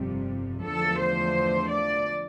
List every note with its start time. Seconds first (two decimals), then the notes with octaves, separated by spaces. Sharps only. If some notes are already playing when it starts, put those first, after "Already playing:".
Already playing: G1 F2 C3 G3
0.63 E2 D3 F3 A3 A4
0.98 C5
1.69 D5